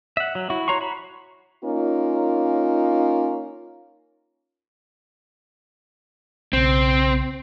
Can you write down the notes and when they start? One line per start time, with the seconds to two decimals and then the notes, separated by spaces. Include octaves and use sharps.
0.17 E5 F#5
0.35 F#3
0.50 E4 F#4
0.68 F#4 C#5 A#5 C6 C#6
0.81 F#4 B5
1.64 A#3 C#4 D#4 F4
6.53 B1 C#3 C4